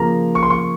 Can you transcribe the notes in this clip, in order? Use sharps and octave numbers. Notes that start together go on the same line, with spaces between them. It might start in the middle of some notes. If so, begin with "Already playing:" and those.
Already playing: C#3 F3 A#3 A#5
C#6
C6
C#6